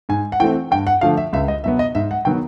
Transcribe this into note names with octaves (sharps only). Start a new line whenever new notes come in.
G#2 G#5
F#5
E3 A3 C4 G5
G2 G5
F#5
D3 F3 A3 D4 F5
E5
C#2 E5
D#5
B2 F#3 B3 E5
D#5
G#2 E5
F#5
D#3 F#3 B3 G5